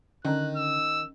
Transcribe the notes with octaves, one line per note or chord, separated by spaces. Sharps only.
D3 D#3 C#4 A#5 F#6
E6